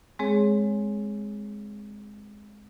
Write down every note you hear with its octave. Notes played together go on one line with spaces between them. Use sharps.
G#3 C4 G#4 C#5